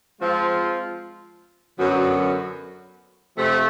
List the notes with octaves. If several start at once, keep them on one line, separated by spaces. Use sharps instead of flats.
F3 G#3 C4 F4
F#2 D3 F#3 B3
C3 F3 A3